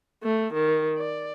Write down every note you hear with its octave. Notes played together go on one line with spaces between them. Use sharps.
A3
D#3
D5